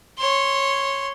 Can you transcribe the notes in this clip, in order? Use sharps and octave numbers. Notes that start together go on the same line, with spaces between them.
C#5 C6